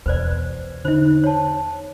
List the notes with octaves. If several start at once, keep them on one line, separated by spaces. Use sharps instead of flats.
E2 B2 B4 C5 D5
D3 D#4 C5
C#5 A5